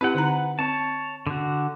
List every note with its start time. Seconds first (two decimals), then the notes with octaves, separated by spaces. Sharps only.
0.01 C4 E4 G4 B4 F#5
0.15 D3 D#4 A#5
0.59 C4 C#5 A5
1.27 D3 F#4